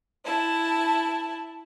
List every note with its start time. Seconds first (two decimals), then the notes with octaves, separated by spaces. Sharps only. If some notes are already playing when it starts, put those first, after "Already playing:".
0.22 E4 A5